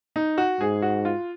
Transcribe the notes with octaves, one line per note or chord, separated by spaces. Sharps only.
D#4
F#4
G#2 G#4
F#4
F4